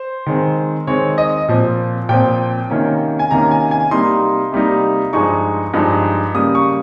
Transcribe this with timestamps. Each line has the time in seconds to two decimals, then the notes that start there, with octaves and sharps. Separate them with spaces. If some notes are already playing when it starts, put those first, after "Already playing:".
Already playing: C5
0.26 D#3 G#3 C4
0.87 D#3 G#3 C4 C#5
1.18 D#5
1.48 A#2 F3 C4
2.09 A#2 F3 C4 G5
2.70 C3 D#3 A#3 C#4
3.19 G#5
3.31 C3 D#3 A#3 C#4 A#5
3.51 G#5
3.71 G#5
3.91 C3 G3 A#3 D#4 C6
4.52 C3 G3 A#3 D#4
5.13 G2 F3 G#3 D#4 C#6
5.74 G2 F3 G#3 D#4
6.35 C#3 G3 A#3 D#6
6.55 C#6